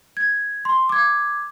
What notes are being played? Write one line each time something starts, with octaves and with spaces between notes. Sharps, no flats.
G#6
C6
D6 G#6